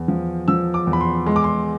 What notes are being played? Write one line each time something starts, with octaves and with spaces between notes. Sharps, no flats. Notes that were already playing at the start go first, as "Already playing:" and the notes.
Already playing: E2
F3
F3 E6
D6
E2
B5
C6
G#3 C6
D6
C6